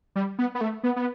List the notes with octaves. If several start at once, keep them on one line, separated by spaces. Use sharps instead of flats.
G3
B3
B3
A3
B3
B3